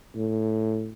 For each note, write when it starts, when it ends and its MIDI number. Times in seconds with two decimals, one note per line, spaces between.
0.16 0.91 45